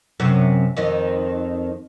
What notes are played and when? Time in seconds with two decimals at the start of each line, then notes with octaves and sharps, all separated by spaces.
0.20 F#2 C3
0.77 F2 D#3